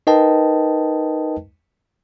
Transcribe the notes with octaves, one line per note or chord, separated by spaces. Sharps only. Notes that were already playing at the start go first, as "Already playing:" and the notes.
D#4 A#4 B4 D#5 G5 A5